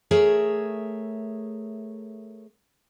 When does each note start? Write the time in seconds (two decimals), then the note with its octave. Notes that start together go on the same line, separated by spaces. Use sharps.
0.11 A3 G#4 A#4 C#5 E5